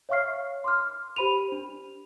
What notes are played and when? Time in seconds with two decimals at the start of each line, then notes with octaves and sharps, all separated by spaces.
0.09 C#5 E5 F5 C#6 F6 C7
0.64 C6 D6 F6
1.16 G4 C5 B5 D#7 F7
1.52 D4